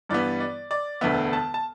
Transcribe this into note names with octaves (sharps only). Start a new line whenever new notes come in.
G2 E3 G3 B3 D5
D5
D5
E1 D2 D3 B3 E5
A5
A5